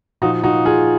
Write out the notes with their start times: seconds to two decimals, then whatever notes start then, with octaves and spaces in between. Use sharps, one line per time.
0.22 A#2 F3 D#4 F#4
0.43 D#4 F#4
0.65 F4 G#4